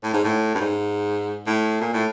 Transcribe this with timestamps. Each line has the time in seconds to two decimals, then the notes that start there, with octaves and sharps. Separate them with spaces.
0.03 A2
0.14 G#2
0.24 A2
0.55 G2
0.60 G#2
1.47 A2
1.81 A#2
1.94 A2